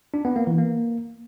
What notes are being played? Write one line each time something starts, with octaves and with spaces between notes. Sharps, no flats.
D4
B3
A#3
E3
A#3